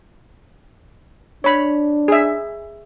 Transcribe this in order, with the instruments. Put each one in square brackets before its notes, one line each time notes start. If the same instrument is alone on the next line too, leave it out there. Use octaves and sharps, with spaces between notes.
[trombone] D4 [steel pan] C#5 B5
[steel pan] G#4 E5